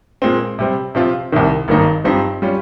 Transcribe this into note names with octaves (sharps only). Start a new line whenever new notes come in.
A#2 G#3 C4
C3 G3 C4
C3 F3 C4 F4
C2 C3 D#3
G#1 G2 D#3 A#3 D#4
G2 F3 C4 D#4 G4
G3 C#4 F4